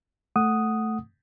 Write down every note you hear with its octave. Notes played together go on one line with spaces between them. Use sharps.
A3 F#5 D#6